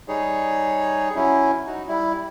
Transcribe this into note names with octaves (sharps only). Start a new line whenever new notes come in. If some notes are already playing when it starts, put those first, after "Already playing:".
G3 D#4 G#4 C#5
F#3 C#4 E4
D#4 F#4
G3 E4